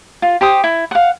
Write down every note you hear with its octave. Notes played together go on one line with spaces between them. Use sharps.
F4
G4 C5 D#6
E4
F5 F#5